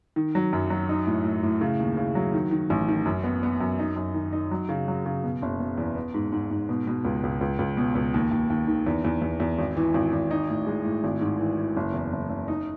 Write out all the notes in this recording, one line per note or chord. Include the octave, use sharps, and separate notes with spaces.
D#3
F#3
F#2
F#3
D#4
A2
A2
A2
C#3
D#2
C#3
F#3
D#3
D#3
A1
D#3
F#2
B3
B3
F#2
D#4
F#2
D#3
D#4
F#3
C#3
F#3
C#3
B2
F#1
B2
E2
B3
G#2
G#2
G#2
B2
B2
C#2
C#2
C#2
C#2
B2
C#2
D#2
D#2
D#2
D#3
E2
E2
E2
E2
G#1
E3
G#1
G#1
D#4
A2
G#3
A2
G#1
G#2
E3
E3
F#1
E2
F#1
F#1
D#4